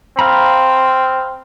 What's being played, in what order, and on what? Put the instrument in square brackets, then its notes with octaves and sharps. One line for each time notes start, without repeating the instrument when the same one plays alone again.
[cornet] C4 [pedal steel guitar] F5 A#5 B5